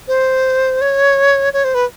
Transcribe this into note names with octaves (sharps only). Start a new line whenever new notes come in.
C5
C#5
C#5
C5
B4